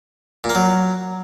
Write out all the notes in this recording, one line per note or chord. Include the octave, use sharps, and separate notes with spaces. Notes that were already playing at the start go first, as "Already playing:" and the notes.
A#2
A#3
F#3